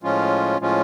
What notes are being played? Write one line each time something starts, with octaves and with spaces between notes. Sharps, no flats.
A2 F3 G#3 C#4 F4
A2 F3 G#3 C#4 F4